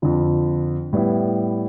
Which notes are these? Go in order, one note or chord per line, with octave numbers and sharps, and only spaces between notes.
F2 D3 F3
A2 G3 B3 E4